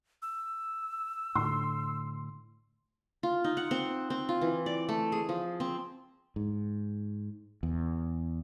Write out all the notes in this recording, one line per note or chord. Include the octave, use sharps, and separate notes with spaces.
E6
A2 D3 C6
F4
D#4
F#5
C4
C4
F4
E3
D5
A3
G#4
F3
C4
G#2
E2